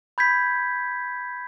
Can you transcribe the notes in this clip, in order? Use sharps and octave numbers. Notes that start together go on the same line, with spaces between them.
B5 G6 G#6 B6